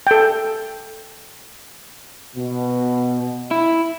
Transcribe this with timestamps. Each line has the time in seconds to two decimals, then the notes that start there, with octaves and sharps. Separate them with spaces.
0.07 A4 G5
2.36 B2
3.51 E4